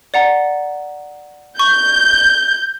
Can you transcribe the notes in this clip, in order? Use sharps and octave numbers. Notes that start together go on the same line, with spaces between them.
D5 F#5 A#5
C#6 G6